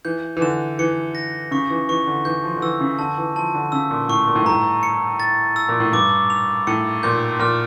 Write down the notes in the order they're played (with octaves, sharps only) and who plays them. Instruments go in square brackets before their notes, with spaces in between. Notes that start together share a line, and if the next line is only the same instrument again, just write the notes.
[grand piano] E3 [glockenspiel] G6
[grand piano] E3
[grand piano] D3 [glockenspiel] E7
[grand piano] E3 [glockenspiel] C#7
[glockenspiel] A#6
[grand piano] C#3 [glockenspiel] C#6
[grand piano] E3
[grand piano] E3 [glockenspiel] C#6
[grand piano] D3
[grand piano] E3 [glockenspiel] G6
[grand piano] F3
D3
[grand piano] E3 [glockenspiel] E6
[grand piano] C#3
[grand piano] D3 [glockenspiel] A5
[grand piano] E3
[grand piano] F3 [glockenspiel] A5
[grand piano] D3
[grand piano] C#3 [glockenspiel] E6
[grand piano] A#2
[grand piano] A2 [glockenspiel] C#6
[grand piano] A#2
A2
G2
[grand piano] A2 [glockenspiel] A#5
[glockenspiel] C#7
A6
E6
[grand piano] A#2
A2
[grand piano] G2 [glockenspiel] D6
[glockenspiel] F7
[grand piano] A2 [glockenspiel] C#7
[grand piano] A#2 [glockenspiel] G6
[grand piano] A#2 [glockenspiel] F6